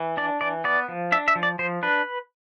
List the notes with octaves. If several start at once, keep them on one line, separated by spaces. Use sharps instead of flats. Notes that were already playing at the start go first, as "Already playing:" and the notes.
Already playing: E3
D4 D5
E3 D5
B3 D5
F3
D4 E5
E5
F3
D5
F3 C5
D4 B4